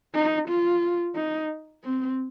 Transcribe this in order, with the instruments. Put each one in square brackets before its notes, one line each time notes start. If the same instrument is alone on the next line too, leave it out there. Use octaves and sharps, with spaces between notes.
[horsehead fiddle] D#4
F4
D#4
C4